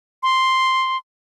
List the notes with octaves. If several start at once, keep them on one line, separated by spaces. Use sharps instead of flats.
C6